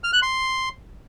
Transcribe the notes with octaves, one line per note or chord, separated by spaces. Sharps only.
F6
F#6
C6